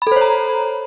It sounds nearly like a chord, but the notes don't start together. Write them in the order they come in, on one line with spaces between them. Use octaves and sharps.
B5 A4 C5 C#5 A#5